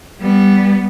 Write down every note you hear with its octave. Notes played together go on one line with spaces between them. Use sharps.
G3 B3